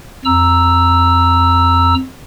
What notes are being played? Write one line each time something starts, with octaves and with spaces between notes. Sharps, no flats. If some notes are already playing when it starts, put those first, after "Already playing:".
F2 A#5 E6